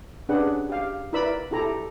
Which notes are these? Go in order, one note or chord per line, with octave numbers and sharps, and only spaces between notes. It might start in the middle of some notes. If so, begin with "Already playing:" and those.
C#4 D4 G4 G#4 B4 F#5
G4 F5
E4 A#4 B4 D5 B5 E6
E4 G4 A4 A#5